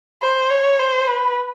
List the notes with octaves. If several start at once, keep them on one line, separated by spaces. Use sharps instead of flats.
C5
C#5
C5
B4